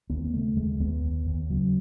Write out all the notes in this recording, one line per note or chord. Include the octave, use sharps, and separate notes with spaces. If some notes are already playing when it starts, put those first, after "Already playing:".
D#2 B3
B3
C#3 A3
D#2 G#3
D#2 B3
D#2
D#2
C#3 F#3